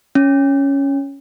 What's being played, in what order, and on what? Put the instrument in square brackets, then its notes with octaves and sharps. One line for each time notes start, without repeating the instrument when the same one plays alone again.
[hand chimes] C#4